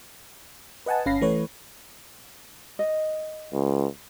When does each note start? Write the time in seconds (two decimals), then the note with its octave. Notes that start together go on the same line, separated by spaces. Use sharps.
0.86 B4 D#5 F#5 G#5 A5
1.06 G1 C#4 F5 B5 A#6 C7
1.21 E3 A3 B4 C#5
2.79 D#5
3.53 C#2